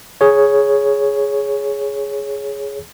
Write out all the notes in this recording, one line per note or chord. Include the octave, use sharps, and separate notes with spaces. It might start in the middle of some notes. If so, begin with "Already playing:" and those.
G#4 C#5